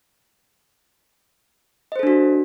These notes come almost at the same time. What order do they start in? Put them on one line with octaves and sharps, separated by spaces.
D#5 C5 A4 D4 F#4